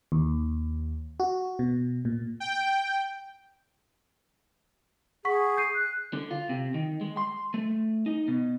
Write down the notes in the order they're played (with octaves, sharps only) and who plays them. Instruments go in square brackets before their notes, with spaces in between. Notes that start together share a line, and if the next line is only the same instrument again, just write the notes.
[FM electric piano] D#2
F#4
B2
A#2
[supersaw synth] G5
[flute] G#4 [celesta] F#5 C#6 B6
[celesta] G6 C7 D#7
[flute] F#6
[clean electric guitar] D3
F4
C3
D#3
G#3
C6
A3
D#4
B2